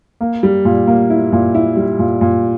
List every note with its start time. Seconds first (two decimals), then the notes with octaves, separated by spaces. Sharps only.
0.21 A#3
0.43 G3
0.65 A#2
0.87 A#3
1.10 E4
1.32 A#2
1.54 E4
1.77 G3
1.99 A#2
2.21 A#2